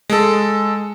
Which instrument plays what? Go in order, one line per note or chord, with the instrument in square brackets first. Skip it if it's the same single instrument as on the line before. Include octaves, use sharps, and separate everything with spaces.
[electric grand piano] G#3 A4